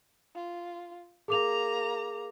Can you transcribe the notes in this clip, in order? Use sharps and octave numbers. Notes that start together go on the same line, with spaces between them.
F4
A#3 G#4 A#5 D6 F7